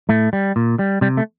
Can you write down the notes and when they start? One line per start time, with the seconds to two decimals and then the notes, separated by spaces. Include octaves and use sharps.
0.09 A2 A3
0.33 G3
0.56 A#2
0.79 G3
1.01 C3 G3
1.17 A3